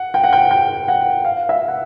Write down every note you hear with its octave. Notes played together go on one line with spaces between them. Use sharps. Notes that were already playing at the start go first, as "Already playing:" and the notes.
Already playing: F#5
G5
F#5
G5
G5
F#5
F5
E5
F#5